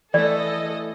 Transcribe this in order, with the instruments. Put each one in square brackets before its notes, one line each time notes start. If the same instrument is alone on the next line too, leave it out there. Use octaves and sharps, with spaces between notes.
[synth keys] E3 A3 [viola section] A4 D#5 [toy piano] D5